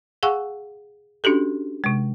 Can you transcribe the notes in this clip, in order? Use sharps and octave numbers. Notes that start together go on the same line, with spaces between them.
G#4 F5 F#5 G#5 C#6 E6
C#4 D4 F#4 G4 A4
C3 G#3